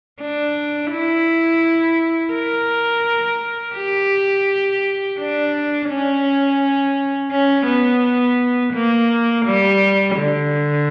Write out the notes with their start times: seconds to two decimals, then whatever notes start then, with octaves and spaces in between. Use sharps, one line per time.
0.21 D4
0.91 E4
2.33 A#4
3.76 G4
5.19 D4
5.90 C#4
7.32 C#4
7.67 B3
8.73 A#3
9.46 G3
10.16 D3